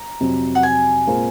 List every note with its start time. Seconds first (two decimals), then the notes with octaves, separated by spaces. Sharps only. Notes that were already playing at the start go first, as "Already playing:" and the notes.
Already playing: A#5
0.20 F2 C3 F#3
0.55 F#5
0.63 G#5
1.07 A#2 G#3 C4 F4 A#4